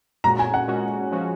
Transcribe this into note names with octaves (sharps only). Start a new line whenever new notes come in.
A#2 G#3 C#4 F#4 A#5
G#5
F#5
A#2 G#3 C#4 F#4
F3 G#3 C#4 F#4